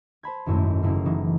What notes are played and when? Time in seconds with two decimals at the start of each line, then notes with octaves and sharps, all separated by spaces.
0.23 C5 A5 B5 G#6
0.46 D#1 G#1 F#2 A3 E4 D6
0.83 F#1 E4 F5
1.06 E3 F#3 D#4